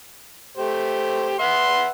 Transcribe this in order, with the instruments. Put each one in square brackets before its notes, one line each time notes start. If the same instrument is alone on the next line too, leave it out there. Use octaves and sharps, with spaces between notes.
[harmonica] A3 G4 C5
[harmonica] B4 E5 F#5 [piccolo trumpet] C6